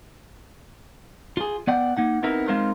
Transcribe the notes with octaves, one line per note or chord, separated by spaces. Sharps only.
F4 G#4
B3 D5 F#5 G5
A#3 D#4 F#5
B3 C4 D#4 E4 A#4
G#3 C4 D#4 F4 A#4 C5